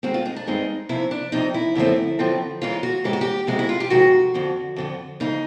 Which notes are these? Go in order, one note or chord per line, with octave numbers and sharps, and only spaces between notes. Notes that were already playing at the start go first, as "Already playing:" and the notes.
G2 D#3 G#3 C4 F#4
F4
D#4
D4
G2 D#3 G#3 C4 D#4
F2 C3 F3 E4
D4
F2 C3 F3 D#4
E4
F#2 D3 F3 A3 C4
F#2 D3 F3 A3 C4
G#2 E3 G#3 C#4 F4
F#4
G#2 E3 G#3 C#4 G4
F#4
G4
F2 C3 D#3 G#3 F#4
E4
F4
G4
F2 C3 D#3 G#3 F#4
F2 D3 F3
F2 D3 F3
F2 C#3 E3 G#3 D#4